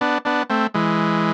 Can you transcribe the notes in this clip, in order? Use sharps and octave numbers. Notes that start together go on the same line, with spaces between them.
B3 D4
B3 D4
A3 C4
E3 G#3